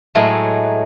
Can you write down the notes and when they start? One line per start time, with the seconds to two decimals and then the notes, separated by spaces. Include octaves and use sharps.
0.15 A2 F#3 G#3 A3